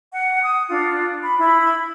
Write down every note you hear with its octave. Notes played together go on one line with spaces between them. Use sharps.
F#5
D#6
D4 F4
B5
E4 B5